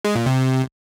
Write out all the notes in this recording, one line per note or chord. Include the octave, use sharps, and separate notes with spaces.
G#3
A#2
C3